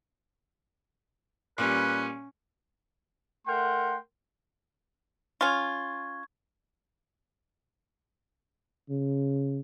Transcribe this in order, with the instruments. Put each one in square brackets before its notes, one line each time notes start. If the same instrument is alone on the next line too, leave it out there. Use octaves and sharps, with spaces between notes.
[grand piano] A#2 G3 [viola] C#4 [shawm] B4
[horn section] A3 A#4 F#5 G5 C6
[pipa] C#4 F4 [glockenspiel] C#6 G#6
[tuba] C#3